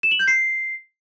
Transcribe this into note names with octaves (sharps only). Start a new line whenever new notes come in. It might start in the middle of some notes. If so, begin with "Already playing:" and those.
E7
F#7
G6
C7